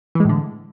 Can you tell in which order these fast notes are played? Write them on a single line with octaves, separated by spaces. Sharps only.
E3 G#3 A2 D3